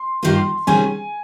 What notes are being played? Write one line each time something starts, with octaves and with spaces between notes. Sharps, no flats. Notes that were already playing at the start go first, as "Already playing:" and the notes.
Already playing: C6
G2 D#3 G3 A#3 F4
C3 D#3 G3 C#4 G#4 G#5